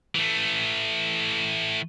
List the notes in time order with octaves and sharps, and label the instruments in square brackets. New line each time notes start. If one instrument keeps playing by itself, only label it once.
[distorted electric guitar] E3 A3